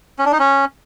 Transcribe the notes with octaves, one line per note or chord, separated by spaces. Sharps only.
C#4
D4
D#4
C#4